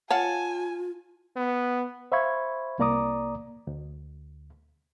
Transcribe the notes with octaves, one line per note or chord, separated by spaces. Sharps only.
F4 C#5 F5 F#5 G#5 A5
B3
C5 E5 F5 B5 C#6 G#6
C2 A#3 D5 A#5 D6 D#6
D2